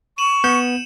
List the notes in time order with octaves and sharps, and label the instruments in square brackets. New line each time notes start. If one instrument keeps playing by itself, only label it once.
[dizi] C#6 [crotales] D#7 E7 F#7
[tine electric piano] B3 G6 [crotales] C#7 E7